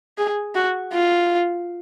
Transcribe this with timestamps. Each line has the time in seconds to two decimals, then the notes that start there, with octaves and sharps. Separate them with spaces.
0.18 G#4
0.55 F#4
0.93 F4